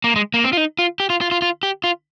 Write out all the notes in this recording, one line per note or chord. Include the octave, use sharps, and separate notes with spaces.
A#3
G#3
A#3
C4
F4
D#4
F4
G4
F4
F4
F4
F4
G4
F4